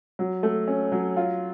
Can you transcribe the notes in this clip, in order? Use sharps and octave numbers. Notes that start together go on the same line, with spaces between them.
F#3
A3
C#4
F#3
F4